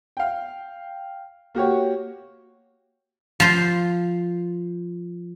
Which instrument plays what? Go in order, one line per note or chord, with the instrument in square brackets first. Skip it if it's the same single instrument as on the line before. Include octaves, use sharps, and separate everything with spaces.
[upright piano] F5 G5
A#3 F#4 G4 C#5
[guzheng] F3 C5